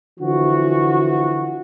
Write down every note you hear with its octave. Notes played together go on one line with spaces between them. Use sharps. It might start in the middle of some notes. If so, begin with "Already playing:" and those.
D3 E3 F3 F#4